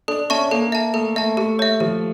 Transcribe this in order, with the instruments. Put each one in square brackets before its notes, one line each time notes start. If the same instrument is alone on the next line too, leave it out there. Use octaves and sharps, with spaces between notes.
[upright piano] D4 [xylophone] A4
[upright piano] C#4 [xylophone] E5 A5 C#6
[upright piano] A#3 [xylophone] A4
[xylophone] E5 A5
[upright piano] A3 [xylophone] A4
[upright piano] A3 [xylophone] E5 A5
[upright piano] A3 [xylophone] G4
[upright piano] A3 [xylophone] C#5 E5
[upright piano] F3 [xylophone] G4